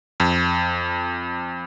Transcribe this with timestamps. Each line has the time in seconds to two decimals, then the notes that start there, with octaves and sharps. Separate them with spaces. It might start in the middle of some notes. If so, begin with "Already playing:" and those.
0.20 F2